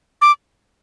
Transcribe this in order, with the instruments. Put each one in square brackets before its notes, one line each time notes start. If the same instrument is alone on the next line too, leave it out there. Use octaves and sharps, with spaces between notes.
[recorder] D6